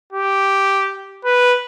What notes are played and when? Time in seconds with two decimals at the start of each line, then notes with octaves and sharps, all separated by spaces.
0.12 G4
1.25 B4